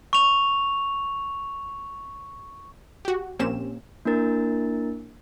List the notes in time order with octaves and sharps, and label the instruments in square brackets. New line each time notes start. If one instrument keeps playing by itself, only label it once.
[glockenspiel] C#6 F7
[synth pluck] F#4 G4
A#1 A#3 C4 C#4 G4 E7
[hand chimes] A#3 D4 E4 A#4 A6